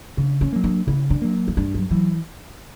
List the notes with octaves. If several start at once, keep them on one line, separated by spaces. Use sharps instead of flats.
C#3 D4
C#4
F#3 A#3
D4
C#3 E4
D4
F#3 A#3
E4
G2 D4
F#3
E3 F#3